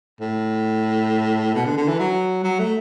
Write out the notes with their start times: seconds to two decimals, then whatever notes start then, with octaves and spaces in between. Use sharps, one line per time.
0.20 A2
1.55 B2
1.66 D3
1.78 D3
1.88 E3
1.99 F#3
2.44 F#3
2.59 A3